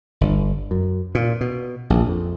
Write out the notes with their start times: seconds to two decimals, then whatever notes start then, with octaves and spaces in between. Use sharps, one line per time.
0.21 G1
0.71 F#2
1.15 A#2
1.41 B2
1.90 A#1
2.08 F2